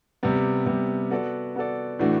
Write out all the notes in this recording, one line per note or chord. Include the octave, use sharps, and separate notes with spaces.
C3 G3 B3
C3 G3 B3
B3 F#4 A4 D5
B3 F#4 A4 D5
A2 E3 A3 D4 F#4